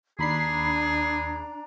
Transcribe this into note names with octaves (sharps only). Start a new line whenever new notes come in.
D#2 D4 G#4 A#5 B5 C7